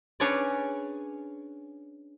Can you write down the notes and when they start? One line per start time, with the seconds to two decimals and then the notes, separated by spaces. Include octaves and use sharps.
0.20 C#4 D4 G#4 B4 C#5 D5